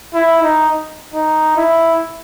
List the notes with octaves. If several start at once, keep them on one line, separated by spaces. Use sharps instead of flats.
E4
D#4
D#4
E4